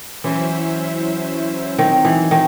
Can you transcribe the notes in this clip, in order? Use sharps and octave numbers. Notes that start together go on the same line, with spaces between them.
E3 F#3 C#4 E4 C5 E5
D#3 F#3 C4 D#4
E3
D#3